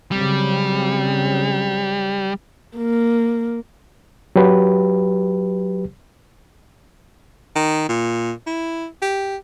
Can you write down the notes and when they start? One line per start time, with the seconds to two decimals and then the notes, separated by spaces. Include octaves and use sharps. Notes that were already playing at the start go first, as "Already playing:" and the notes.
0.11 C#3 F#3 G3 C4
2.77 A#3
4.36 F#3 G4 B4
7.56 D#3
7.89 A#2
8.47 E4
9.02 G4